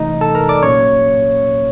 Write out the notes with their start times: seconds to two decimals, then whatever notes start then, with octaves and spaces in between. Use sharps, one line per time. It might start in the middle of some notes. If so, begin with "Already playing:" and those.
Already playing: C3 E3 A3 D#4 D#5
0.21 A4 A5
0.35 A#4 A#5
0.49 D5 D6
0.62 A#2 F#3 A#3 C#4 C#5 C#6